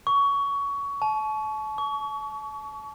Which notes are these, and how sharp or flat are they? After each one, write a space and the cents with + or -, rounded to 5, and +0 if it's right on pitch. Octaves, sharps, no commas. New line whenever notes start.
C#6 +20
A5 -35
C#6 +35